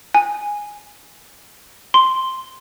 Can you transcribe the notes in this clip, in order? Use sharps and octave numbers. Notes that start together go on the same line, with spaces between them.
G#5
C6